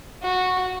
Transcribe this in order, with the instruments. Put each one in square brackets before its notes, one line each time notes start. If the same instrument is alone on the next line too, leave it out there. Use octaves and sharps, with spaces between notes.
[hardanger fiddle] F#4